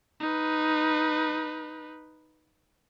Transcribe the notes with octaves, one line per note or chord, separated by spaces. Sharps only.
D#4 B4